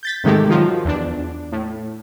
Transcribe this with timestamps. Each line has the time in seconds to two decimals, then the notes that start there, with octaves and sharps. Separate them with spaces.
0.03 G6 A6 B6
0.24 G#2 C3 D#3 G#3 A3 G4
0.49 D#3 F3 F#3
0.85 E2 D4
1.52 A2